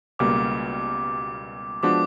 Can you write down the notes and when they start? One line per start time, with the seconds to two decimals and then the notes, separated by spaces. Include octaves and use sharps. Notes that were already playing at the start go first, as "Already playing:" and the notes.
0.19 C#2 B2 G3 A#3 D6
1.83 F3 G#3 B3 D4 F#4 D6